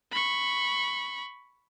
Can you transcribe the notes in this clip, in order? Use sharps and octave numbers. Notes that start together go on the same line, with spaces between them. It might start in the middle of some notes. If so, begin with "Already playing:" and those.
B5 C#6